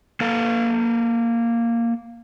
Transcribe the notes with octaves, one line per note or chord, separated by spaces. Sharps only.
A#3 A4 F5